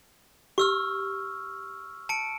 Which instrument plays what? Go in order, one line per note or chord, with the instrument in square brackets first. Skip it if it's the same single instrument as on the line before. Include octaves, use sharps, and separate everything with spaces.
[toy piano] G4 [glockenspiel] C#6 E6 F6
[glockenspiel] A5 C#7 D7